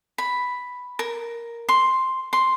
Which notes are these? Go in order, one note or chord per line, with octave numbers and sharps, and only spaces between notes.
B5
A#4
C6
C6